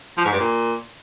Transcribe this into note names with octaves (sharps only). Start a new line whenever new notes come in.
F3
G#2
G2
A#2